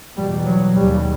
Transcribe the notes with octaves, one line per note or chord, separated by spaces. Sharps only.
E2 B2 G3
F#3
D#2 C#3 G3